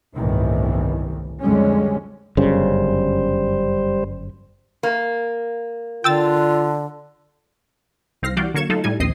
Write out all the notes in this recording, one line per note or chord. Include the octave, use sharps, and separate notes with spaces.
G1 C2 A2 D#3 E3
F2 D3 G3 G#3 C#4
G1 F#2 C#3 G3 C5
A#3
D3 F4 G5 E6 A6
C2 C4 F5 A#6 C7
E3 G3 F#4 D5 F5 G6
D3 F#3 A#3 C#6 G#6 E7
F#3 A3 D#4 F4 A4
A2 G3 D#4 G#5 G#6
A#1 D#2 C4 D#5 D#6 C7